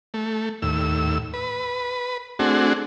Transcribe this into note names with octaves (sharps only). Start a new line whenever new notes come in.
A3
D#2 A2 E6
B4
A3 C4 D4 F#4 G#4